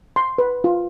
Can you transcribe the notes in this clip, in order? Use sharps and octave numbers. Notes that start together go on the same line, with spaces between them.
C6
B4
F4